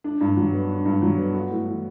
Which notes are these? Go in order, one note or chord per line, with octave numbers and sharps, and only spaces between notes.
D4
G2
F#3
B3
D4
G2
F#3
B3
F#4
A2
E3